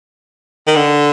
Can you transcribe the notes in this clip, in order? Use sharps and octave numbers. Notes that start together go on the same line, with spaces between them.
D#3
D3